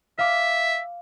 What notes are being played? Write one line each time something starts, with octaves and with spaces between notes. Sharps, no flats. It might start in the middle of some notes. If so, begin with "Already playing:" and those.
E5 F5 D6